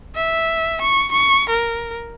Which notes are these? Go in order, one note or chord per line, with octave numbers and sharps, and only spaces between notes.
E5
C#6
C#6
A#4